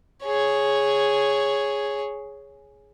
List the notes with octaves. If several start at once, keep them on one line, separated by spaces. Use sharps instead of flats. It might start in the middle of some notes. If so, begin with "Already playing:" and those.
G#4 C#5